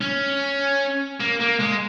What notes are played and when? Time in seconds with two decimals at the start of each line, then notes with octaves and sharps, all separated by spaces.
0.01 C#4
1.20 A#3
1.40 A#3
1.60 G#3